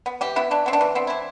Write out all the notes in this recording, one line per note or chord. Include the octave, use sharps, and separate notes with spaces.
B3
E3 G4
B3 E4
E3 D4
B3 C4
D4
E3
B3 C4
E3 E4